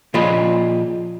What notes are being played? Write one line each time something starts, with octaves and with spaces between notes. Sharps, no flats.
A#2 F3 F4 G#4 D#5 B5